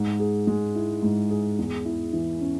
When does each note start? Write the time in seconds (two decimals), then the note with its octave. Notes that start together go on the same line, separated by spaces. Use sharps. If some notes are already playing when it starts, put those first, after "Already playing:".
Already playing: G#2
0.20 G#4
0.47 G#3
0.75 E4
1.02 G#2
1.30 G#4
1.58 E2
1.85 E4
2.13 E3
2.41 C#4